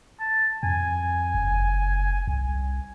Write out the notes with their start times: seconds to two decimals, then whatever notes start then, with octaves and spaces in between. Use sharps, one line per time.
0.20 A5
0.63 F2 G#5
1.35 F#1
2.27 C2